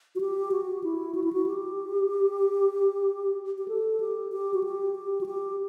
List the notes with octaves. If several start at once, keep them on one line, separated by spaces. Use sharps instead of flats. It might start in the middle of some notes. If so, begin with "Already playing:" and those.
F#4
G4
F#4
E4
F#4
E4
F#4
G4
G4
A4
G4
G4
F#4
G4
G4
F#4
G4